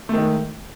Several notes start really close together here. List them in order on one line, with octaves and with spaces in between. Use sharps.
A3 D#3 G#3